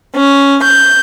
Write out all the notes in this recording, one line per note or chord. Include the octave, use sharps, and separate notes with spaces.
C#4
G6